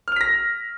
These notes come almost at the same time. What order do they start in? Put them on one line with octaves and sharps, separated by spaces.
F6 F7 B6 A#6